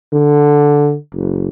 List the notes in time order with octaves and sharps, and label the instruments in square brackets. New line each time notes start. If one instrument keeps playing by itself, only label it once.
[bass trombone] D3
F#1